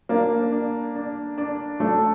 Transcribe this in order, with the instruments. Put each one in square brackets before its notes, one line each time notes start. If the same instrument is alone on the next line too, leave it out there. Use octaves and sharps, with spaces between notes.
[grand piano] A#3 [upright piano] D4
[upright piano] D4
D4
D4
[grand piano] A3 [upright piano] D4